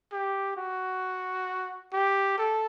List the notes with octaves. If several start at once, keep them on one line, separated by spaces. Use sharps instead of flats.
G4
F#4
G4
A4